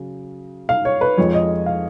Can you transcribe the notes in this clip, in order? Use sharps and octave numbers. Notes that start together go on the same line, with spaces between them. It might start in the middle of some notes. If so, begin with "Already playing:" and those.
Already playing: C#3 F#3
F5
C#5
B4
F2 F3 G#3 C#5
D#5
F5